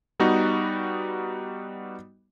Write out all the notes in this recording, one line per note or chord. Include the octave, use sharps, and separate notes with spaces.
G3 B3 D#4 F#4